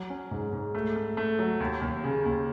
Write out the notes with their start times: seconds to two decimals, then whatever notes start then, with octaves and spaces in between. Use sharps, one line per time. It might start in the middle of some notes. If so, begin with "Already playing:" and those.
Already playing: F#3
0.10 C#4
0.31 G#2
0.53 G#2
0.75 A3
0.96 A3
1.17 A3
1.39 F#3
1.60 D#2
1.81 D#2
2.03 C#3
2.25 D#2